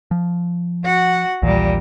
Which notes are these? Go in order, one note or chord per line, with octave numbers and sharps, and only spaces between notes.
F3
F#4 F#5
A#1 D#2 A#2 E3 G3